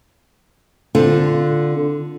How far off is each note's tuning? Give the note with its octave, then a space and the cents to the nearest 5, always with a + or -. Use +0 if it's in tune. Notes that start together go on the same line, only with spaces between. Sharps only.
D3 +0 C4 +0 F4 +0